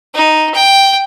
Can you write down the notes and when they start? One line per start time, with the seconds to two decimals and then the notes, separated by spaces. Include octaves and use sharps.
0.14 D#4
0.54 G5